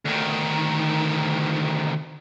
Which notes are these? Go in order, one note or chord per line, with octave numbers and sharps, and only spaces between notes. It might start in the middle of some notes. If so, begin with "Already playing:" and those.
D2 D#3